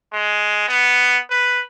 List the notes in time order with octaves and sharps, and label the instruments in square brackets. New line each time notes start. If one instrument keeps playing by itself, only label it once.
[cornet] G#3
B3
B4